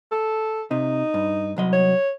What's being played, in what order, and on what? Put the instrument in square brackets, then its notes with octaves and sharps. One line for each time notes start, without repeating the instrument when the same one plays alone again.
[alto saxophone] A4
[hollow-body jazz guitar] C3 [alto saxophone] D#4
[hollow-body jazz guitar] G2
C2 F#3 D#5
[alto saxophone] C#5